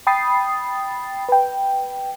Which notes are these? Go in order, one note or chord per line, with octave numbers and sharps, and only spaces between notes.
G5 B5 D#6 A6 C7
B4 G5